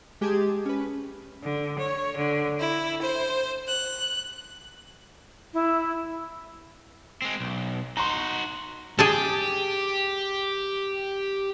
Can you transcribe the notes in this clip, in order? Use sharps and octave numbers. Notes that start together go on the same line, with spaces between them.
G#3 G4 G#4 A5 G#6
C#4 B4
D3
C#5
D3
E4
C5
F#6
E4
G#3 C4
B1
D#4 F#4 A#5 C6
G4 G#4 G#5 A5